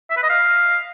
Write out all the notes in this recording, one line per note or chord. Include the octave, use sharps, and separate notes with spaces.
E5
B4
D#5
F5